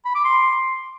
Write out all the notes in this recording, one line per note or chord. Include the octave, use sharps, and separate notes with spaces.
B5
D6
C6